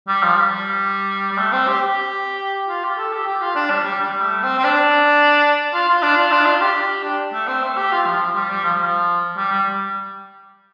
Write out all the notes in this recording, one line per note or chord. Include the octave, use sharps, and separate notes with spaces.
G3
F3
G3
G3
A3
C4
G4
G4
F4
G4
A4
G4
G4
F4
D4
G3
G3
G3
A3
C4
C4
D4
F4
F4
D4
F4
D4
F4
G4
D4
A3
C4
A3
G4
F4
F3
F3
G3
G3
F3
F3
G3
G3